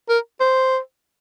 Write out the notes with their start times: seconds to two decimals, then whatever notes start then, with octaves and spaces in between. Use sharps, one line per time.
0.09 A#4
0.40 C5